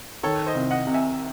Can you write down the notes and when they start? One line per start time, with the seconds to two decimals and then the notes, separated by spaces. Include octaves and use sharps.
0.23 D#3 A4 C#5
0.46 C5 D#5
0.55 C2
0.71 D#5 F#5
0.87 C3
0.94 E5 G#5